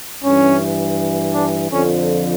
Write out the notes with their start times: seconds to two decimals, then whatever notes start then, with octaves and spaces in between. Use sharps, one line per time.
0.23 G2 E3 C#4
1.33 D4
1.70 F2 D3 F3 C#4